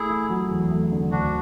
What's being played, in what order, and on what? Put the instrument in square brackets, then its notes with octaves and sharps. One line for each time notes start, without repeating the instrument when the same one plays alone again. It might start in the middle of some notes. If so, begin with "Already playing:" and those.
Already playing: [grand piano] A3 [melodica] E4 G#4
[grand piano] A3
F#3
E2
A3
D3
[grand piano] D2 [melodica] D4 F#4